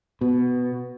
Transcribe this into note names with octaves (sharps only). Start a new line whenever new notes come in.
B2 B3